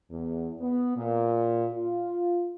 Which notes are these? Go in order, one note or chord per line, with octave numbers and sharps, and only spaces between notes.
E2
B3
A#2
F4